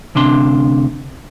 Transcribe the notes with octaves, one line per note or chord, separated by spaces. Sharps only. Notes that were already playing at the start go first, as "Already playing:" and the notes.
D2 C3 D4 C6